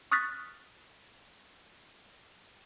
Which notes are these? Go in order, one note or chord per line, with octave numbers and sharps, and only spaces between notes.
C#6 D#6 F6 F#6 A6 B6